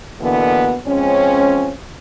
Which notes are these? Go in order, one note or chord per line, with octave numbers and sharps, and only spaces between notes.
B2 D3 E3 A#3 B3
F3 G#3 C4 C#4